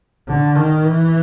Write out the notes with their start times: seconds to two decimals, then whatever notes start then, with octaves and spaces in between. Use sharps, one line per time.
0.28 D3
0.56 D#3
0.86 E3